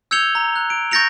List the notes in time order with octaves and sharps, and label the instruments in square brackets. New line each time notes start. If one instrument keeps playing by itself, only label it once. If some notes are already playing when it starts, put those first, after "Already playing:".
[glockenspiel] E6 G6 G#6 C#7 F7 G7
A#5
F#6
D7
C#6 G6 A6 A#6 C#7 F7